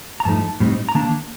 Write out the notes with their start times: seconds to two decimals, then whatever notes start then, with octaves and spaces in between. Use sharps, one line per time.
0.20 A#5
0.25 G2 F3 A3 D#4 A5
0.60 A2 G3 C4 D#4
0.89 A#5
0.95 D#3 A#3 D4 A5